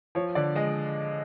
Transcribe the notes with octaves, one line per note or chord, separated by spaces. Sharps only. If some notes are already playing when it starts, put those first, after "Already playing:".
F3 C#5
D3 D5
G#3 D#5